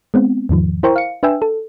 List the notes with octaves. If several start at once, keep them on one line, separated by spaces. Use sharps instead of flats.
G#3 B3 C4
E2 G#2 D#3 F3
E4 A#4 C5 G5 A#5 C#6
F5 C#7
D4 B4 E5 G5 G#5 E6
A4